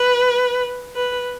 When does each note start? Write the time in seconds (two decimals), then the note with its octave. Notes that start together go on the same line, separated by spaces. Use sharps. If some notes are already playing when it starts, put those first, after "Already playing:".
Already playing: B4
0.95 B4